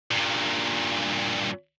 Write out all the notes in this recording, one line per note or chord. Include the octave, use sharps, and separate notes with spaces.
G2 A#2